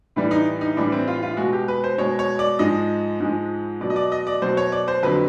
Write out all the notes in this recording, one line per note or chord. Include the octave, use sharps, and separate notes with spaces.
A2 E3 G3
D#4
D#4
A2 E3 G3 D4
C4
F4
F4
B2 G#3 F#4
G4
B4
C5
B2 G#3 C#5
C#5
D5
G#2 F3 G#3 D#5
G#2 F3 G#3
B2 F#3 D5
D#5
D5
D#5
D5
B2 F#3 C5
C#5
D5
C5
F2 D3 F#3 B4